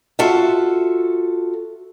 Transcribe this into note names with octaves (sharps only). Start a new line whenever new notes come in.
F4 F#4 A4 E5